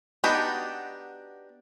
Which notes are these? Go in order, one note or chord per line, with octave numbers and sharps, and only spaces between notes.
B3 D4 D#4 F#4 G4